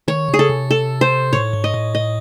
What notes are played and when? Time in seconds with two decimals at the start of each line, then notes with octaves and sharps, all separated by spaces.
0.08 D#3 C#5
0.29 C#3
0.34 G#4
0.39 A4
0.50 C3
0.71 A4
1.01 C5
1.33 A2 C#5
1.53 G#2
1.64 D#5
1.74 A2
1.95 D#5